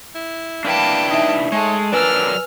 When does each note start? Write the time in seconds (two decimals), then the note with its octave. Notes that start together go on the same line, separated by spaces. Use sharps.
0.15 E4
0.65 A#3 D4 E4 B4 G5 A5
1.10 D#4 D#5 E5
1.52 G#3 A3 C#5
1.93 F#3 D4 A#4 B4 D5 G#5 E6 F6